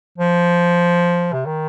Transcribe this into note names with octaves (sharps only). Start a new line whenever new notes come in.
F3
C3
D#3